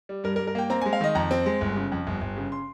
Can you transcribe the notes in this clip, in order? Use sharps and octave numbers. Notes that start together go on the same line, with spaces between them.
G3
G2 A#4
A#4
G2
A#4
A#3 G5
C4 A#5
G#3 G#5
F5
D#3 D#5
F2 A#5
C4
G#3
G1
C#3
F2
G1
G1
C#3
C6